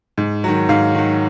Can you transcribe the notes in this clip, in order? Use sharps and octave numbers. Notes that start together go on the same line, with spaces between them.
G#2
D#3 F#3
G#2 F5
D#3 F#3